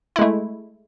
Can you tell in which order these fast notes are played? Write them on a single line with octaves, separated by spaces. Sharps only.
E4 G#3 A3